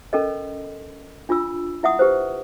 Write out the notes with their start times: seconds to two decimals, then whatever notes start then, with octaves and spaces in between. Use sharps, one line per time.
0.13 C#4 A4 A#4 D#5
1.29 D4 F4 B5 E6
1.83 E4 E5 F#5 D#6
1.99 G4 B4 C5